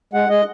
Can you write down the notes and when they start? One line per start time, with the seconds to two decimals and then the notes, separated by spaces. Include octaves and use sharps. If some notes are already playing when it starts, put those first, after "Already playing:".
0.13 G#3 F#5
0.29 G#3 D#5